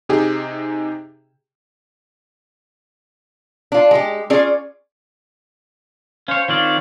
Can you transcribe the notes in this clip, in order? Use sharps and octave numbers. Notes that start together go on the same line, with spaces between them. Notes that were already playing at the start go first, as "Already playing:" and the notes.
C3 D#4 G4 G#4
D4 F4
G#3 G4
C#4 F4 G#4 D5
C#4 C5 C#5 F5
D#3 C4 F4 C#5 D5 F5